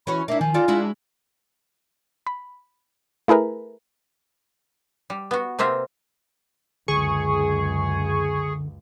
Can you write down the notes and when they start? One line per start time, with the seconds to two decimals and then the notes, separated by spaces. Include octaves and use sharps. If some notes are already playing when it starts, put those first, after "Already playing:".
0.07 E3 C#4 F#4 C#5 B5
0.28 A#3 D4 E4 E5
0.41 D#3 F3 G#5
0.54 D#4 F4 A4 D5
0.68 G#3 D4 E4 F#4
2.27 B5
3.28 A3 E4 G#4 A#4 B4
5.10 G3
5.31 B3 F#4
5.59 C3 A#3 C4 F4 E5
6.88 C#2 F#2 D3 G#4 C#6